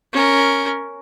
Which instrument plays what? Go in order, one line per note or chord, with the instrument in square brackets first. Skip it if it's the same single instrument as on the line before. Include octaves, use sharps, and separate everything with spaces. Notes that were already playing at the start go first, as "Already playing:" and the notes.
[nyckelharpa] C#4 A#4